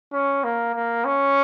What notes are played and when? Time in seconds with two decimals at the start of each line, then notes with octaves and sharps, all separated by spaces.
0.13 C#4
0.44 A#3
0.74 A#3
1.05 C#4